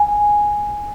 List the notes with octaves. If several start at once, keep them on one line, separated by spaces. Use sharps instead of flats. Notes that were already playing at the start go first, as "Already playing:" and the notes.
Already playing: G#5